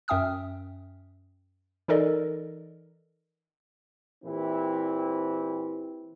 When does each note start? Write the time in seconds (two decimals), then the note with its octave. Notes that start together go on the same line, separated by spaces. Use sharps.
0.08 F#2 C#4 E5 G5 D#6 F6
1.88 E3 D#4 A4 A#4 D5 D#5
4.24 A#2 E3 C4 E4 G4